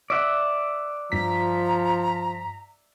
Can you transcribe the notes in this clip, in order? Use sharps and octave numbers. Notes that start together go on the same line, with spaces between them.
D5 E5 F#5
G2 F3 A#5 B6